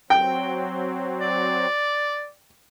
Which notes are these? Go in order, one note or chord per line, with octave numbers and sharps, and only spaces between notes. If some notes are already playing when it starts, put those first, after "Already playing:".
F#3 C4 G5
D5